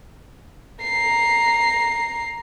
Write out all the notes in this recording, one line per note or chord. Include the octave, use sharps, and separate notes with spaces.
A#5 C7